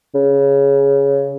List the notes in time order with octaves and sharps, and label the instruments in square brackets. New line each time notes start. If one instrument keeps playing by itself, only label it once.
[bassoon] C#3